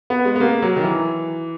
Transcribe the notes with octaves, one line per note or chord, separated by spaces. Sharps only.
B3
G#3
B3
A#3
F#3
D#3
E3